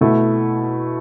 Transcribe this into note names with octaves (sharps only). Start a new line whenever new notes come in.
B2 A3 E4